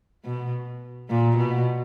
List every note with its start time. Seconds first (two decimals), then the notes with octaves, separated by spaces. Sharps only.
0.24 B2
1.09 A#2
1.37 B2